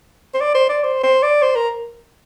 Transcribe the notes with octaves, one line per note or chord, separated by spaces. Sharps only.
C5
D5
C5
D5
C5
C5
D5
C5
A#4